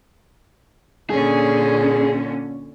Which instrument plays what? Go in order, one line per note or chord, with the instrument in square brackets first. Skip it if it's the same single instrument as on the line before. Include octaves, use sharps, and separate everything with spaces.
[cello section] A#2 D3 C#4 [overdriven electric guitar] G#4